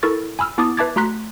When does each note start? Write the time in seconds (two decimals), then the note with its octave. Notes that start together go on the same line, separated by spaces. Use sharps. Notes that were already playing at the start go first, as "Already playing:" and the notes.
0.03 E4 A4 A#4 C#6 A6
0.39 G#5 B5 E6 F6
0.58 B3 E4 A5 D6 D#6 A6
0.77 B4 E5 A5 D6 G#6 A6
0.96 A3 F#4 A#5 C6 F#6 B6